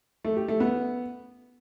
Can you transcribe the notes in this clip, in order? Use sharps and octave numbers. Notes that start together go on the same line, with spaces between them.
A3
G4
A3
B3